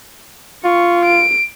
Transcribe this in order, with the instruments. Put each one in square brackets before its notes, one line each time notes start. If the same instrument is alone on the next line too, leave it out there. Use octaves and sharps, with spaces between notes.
[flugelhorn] F4 [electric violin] C#6
[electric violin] D7